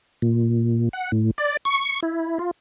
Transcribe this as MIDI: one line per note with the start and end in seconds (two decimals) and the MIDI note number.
0.22 0.89 46
0.93 1.11 78
1.12 1.31 45
1.38 1.57 74
1.65 2.00 85
2.03 2.38 64
2.39 2.51 65